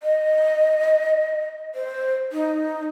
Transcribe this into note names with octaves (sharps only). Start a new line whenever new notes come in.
D#5
C5
D#4